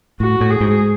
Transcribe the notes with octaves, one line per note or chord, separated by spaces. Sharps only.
A2 F#4
A2
G#4
G#2